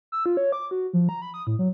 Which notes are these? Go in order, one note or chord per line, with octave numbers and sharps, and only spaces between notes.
E6
F4
C#5
D6
F#4
F3
A#5
B5
D#6
A2
F#3